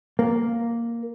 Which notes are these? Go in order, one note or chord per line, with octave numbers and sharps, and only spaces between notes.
A#3